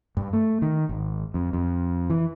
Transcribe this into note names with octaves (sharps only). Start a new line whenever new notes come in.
G2
A3
D#3
G#1
F2
F2
E3